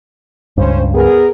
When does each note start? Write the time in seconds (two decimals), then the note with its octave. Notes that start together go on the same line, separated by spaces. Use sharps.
0.57 C#2 G2 C#4 C5
0.94 B3 G#4 A#4